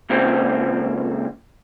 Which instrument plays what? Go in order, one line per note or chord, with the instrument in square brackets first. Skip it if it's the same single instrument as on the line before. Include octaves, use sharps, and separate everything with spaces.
[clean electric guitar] C#2 A#2 C#3 C4